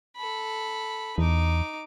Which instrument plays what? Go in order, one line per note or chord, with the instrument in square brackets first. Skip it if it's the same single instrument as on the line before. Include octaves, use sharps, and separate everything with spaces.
[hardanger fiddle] A4 B5
[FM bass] E2 [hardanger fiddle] D#4 D6